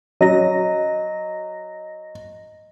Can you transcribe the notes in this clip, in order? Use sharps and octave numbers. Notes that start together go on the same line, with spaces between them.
F#3 D#5 A#6